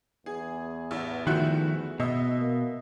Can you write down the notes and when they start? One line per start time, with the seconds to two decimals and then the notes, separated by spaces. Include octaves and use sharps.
0.26 E2 G#4
0.91 A1
1.27 D#3 F3 A3 E4 F#4 F#6
2.00 B2 D#5 E5
2.40 A#3